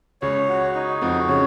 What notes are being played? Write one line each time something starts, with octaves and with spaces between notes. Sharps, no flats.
C#2 C#3 C#5
F#4
D#4
F2 F3 F#4
C#3 C#5